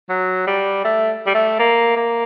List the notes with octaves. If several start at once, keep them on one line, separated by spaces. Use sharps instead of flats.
F#3
G3
A3
G3
A3
A#3
A#3